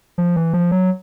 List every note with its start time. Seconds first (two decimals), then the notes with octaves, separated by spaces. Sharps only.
0.18 F3
0.36 E3
0.53 F3
0.71 F#3